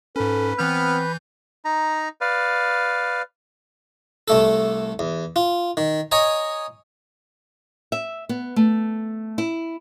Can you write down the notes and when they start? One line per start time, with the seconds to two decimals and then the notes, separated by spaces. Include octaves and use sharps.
0.16 G#2 C#4 A4 B4
0.59 E3 B3 C4 F6 G6
1.65 D#4 A#5
2.21 B4 D5 F5
4.28 C2 A3 A4
4.99 E2
5.36 F4
5.77 D#3
6.12 C#5 D#5 G#5 A#5
7.92 E5
8.29 B3
8.56 A3
9.38 E4